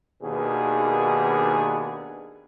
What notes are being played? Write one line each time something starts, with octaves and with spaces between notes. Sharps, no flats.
D#2 B2 D#3 B3 D4 G#4